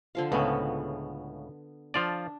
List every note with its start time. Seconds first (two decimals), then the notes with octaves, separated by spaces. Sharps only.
0.15 D3 F3 F5
0.32 C#2 A2 C#3 B3
1.94 F3 D4 F4 D5